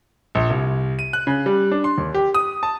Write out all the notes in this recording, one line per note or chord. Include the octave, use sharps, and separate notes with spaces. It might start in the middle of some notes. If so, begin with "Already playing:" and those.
A#1
C2
D#7
F#6
C#3
G3
D4
C6
D#2
G4
D#6
A5